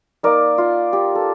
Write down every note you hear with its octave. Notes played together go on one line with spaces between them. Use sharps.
A#3 D#4 A#4 D5
F4
G4
A4